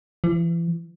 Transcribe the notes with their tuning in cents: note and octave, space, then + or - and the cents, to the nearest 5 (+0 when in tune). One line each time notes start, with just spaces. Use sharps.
E3 +35